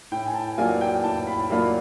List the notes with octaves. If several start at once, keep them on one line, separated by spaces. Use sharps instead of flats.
A2 G5
G#5
A5
F#3 A#3 D4 F4 G#5
G5
A2 A5
B5
F#3 A#3 D4 F4 B5